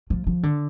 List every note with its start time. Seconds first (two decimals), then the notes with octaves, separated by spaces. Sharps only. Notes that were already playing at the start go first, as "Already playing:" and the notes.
0.10 F3
0.27 F3
0.43 D3